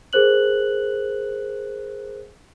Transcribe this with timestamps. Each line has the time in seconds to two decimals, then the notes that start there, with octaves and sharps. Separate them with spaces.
0.13 G#4 A#4 C5 F#6 F#7